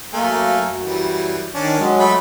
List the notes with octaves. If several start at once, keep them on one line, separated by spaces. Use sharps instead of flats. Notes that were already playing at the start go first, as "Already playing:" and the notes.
F#2 A3 A#3 A#4 G#5
F#2
E3 G3
D#3 C#4 D4
F#3 G#3
A3 B5